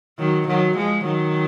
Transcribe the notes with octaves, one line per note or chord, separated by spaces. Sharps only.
D#3 F#3
D#3 F#3
F3 G#3
D#3 F#3